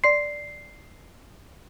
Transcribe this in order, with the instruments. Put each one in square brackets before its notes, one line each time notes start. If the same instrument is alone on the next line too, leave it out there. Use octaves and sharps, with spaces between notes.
[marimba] D5 C6 [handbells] C7